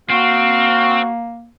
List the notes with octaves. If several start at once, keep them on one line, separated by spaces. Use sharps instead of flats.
A#3 C4 F#4 F6